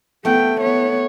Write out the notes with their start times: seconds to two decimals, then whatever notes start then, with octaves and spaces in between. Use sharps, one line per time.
0.25 A3 B3 G5
0.60 B3 C#5